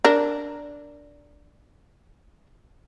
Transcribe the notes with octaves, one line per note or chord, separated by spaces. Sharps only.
D4 A#4